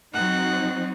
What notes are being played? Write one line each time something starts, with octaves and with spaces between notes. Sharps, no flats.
F#3 C4 D#4 F#5